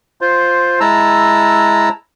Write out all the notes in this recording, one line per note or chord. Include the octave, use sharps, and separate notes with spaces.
F4 C5
G#3 E4 A5 A#5 E6